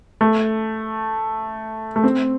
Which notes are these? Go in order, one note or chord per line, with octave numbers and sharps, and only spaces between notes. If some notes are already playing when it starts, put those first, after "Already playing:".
A3
A3
C4